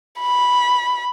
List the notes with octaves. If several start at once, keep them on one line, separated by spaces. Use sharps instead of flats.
B5